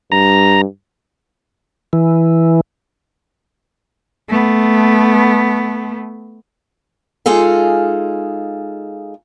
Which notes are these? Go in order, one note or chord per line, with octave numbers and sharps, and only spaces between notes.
G2 A#5
E3
A3 B3
G#3 D#4 F4 G#4 A4 F5